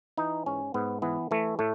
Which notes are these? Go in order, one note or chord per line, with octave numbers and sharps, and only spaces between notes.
E3 D#4
G#2 C#4
G#2 B3
E3 B3
E3 A3
A2 A3